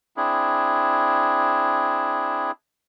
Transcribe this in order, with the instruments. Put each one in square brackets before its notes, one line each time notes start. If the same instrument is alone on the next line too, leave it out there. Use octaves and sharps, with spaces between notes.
[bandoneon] C4 D4 E4 G#4